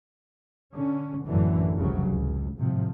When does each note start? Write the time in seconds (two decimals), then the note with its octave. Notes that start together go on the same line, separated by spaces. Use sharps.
0.71 D3 C#4
1.25 A1 F#2 A2 D3 E3
1.76 F1 C2 C#3 F#3
2.09 C#2 A2
2.57 G#1 A2 C3 F3